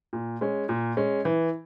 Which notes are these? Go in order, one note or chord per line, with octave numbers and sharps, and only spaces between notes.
A#2
G#3 C#4
A#2
G#3 C#4
E3